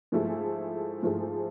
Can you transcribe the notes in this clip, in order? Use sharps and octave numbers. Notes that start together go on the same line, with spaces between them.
G#2 F3 A3 E4 G#4
G#2 F3 A3 E4 G#4